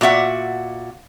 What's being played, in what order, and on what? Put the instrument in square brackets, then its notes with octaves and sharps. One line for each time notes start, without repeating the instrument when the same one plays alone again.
[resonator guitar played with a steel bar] A#2 F#4 E5 F#5